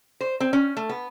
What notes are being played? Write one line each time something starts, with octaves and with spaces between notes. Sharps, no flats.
C5
C4
C#4
A3
B3